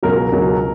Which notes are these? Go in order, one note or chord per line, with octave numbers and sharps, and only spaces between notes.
C#2 B2 F#3 A#4
C#2 B2 F#3